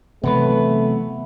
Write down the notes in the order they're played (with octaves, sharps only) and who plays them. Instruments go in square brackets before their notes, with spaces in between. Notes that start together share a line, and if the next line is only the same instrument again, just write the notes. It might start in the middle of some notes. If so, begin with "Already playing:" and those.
[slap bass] C3 E3 F#3 [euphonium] A3 [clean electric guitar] B3 B4